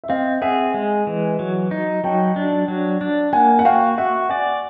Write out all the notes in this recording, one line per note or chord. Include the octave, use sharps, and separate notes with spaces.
E5
C4 D#5 F5
G#4 E5 F#5
G#3
E3
F#3
D#4
F#3 G5 A5
D4
F#3
D4
A#3 F#5 G#5
F#5
F#4 F5 G5
F#4 E5 F#5
D5 F#5 G#5